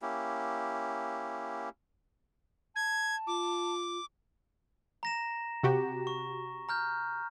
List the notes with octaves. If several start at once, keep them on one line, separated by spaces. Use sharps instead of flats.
A#3 C#4 E4 G4
A5 G#6
F4 D6
A#5 A#6 E7
C3 F#4 G4
C#6
A#5 F6 G6